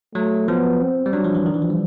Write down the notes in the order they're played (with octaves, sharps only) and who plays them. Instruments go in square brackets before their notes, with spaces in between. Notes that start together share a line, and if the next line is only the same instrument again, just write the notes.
[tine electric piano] F#3 [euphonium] A3
[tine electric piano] F3 [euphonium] B3
[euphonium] C4
[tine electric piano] G3
[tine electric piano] F#3 [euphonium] D4
[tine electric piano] F3
E3
D#3
E3
F3
G3